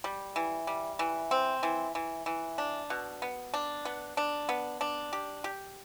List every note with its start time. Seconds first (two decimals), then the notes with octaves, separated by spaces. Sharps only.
0.04 G3
0.36 E3
0.67 G3
0.99 E3
1.31 C4
1.63 E3
1.95 E3
2.26 E3
2.58 D4
2.90 B2
3.22 B3
3.54 D4
3.85 B3
4.17 D4
4.49 B3
4.81 D4
5.13 G4
5.44 G4